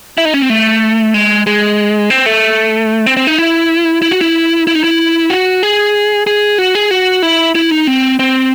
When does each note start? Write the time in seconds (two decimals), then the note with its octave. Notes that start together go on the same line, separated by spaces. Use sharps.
0.18 E4
0.25 D#4
0.34 C#4
0.42 C4
0.50 A3
1.14 G#3
1.47 G#3
2.10 C4
2.26 A3
3.06 C4
3.17 C4
3.27 D#4
3.38 E4
4.02 E4
4.11 F#4
4.21 E4
4.67 E4
4.75 D#4
4.84 E4
5.30 F#4
5.63 G#4
6.27 G#4
6.58 F#4
6.75 G#4
6.91 F#4
7.22 E4
7.55 E4
7.71 D#4
7.87 C4
8.19 C4